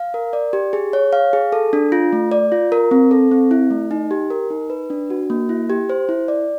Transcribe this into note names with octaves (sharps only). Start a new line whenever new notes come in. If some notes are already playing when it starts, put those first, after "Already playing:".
Already playing: F5
A#4
D5
G4
G#4
C#5
F5
G#4
A4
D4
F4
A3
D5
F4
A#4
C4
A4
C4
E4
A3
D#4
G4
A#4
D#4
B4
D4
F#4
A#3
E4
G4
C5
E4
D5